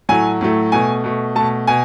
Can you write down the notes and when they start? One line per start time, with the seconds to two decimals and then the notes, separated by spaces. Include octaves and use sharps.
0.09 A2 F#3 A3 G#5
0.41 A2 F#3 A3
0.72 B2 A3 G#5
1.04 B2 A3
1.35 B2 A3 A5
1.67 B2 G#5